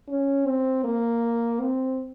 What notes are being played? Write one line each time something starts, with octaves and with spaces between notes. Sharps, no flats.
C#4
C4
A#3
C4